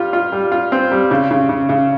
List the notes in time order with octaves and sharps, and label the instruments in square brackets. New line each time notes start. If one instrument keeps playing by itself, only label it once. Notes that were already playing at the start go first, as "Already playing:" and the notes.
Already playing: [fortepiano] G3 F4
F4
G3
F4
C4
G3
C#3
C#3
C#3
C#3